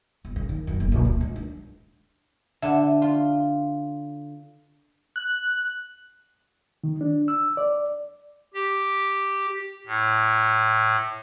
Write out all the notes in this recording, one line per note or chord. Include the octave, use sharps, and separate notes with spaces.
G1
C#3
D#3
F#2
F#1
A#1
D1
C#2
D4
D3 E5
F4
F#6
D#3
D4
E6
D5
G4
A2